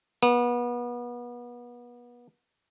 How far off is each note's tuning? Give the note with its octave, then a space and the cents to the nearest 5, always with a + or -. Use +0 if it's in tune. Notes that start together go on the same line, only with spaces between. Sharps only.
B3 -30